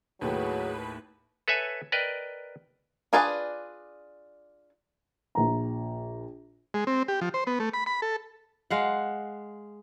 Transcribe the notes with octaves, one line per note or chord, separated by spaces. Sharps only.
D#2 A2 F#3 G#4 B4 G5
A4 B4 C#5 E5 G#5
A#4 B4 D5 D#5 G5
D4 F4 G#4 B4 D5
A#1 A#5
G#3
C4
G4
F3
C5
B3
A3
B5
B5
A4
G#3 F5 F#5